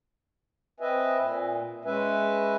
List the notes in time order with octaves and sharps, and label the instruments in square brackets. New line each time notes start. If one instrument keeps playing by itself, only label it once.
[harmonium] C4 B4 D#5 E5 G#5
A#2
G#3 C#4 B4 E5 G#5